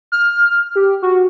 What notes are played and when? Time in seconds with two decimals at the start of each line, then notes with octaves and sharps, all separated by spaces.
0.12 F6
0.76 G4
1.02 F#4